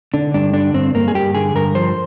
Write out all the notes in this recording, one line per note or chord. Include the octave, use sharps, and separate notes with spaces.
D3 D4
G2 D4
D3 D4
G2 C4
G2 A#3
G#4
G2 G4
D3 G#4
G2 A#4
F3 C5